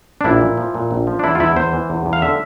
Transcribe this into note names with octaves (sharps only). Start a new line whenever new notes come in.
D4
A#1 E4
A#2
F3
A#2
A#1
F3
D4
E2 E4
F4
E2 E4
E2 C5
E3
E2
E2
F5
D3 E5